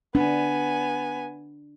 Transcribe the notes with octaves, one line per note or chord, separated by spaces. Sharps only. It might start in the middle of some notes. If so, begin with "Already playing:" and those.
B3 D4 G#5